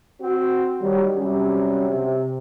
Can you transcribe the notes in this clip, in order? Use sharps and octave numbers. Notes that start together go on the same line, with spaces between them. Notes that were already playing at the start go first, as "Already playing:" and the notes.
C4 F#4
D#3 F#3 G3
C3 F#3 G3 C#4
C3